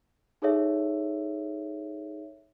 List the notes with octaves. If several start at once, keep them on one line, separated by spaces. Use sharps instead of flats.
D#4 G#4 A4 C#5 E5